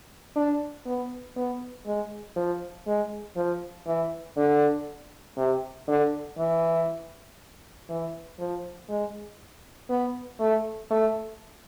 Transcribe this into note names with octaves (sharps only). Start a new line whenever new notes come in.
D4
B3
B3
G#3
F3
G#3
F3
E3
D3
C3
D3
E3
E3
F3
G#3
B3
A3
A3